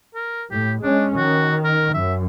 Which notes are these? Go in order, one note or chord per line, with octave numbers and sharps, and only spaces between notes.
A#4
A2 G4
G#3 C#4 D4
D#3 F#4
A#4
F#2 E5